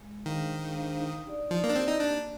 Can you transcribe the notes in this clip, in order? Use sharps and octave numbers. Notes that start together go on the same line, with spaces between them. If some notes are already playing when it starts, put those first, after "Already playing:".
G#3
D#3 D4 G#4 C5 F5
G#3
D4 G#4 C5 F5
D#4
G4 D5
F3 D#4
A#3
D4
C4 G4 D5
D#4
A#3 D4